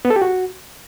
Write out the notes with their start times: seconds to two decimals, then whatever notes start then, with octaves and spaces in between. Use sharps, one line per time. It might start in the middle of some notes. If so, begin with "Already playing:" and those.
0.05 B3
0.10 A4
0.16 G4
0.22 F#4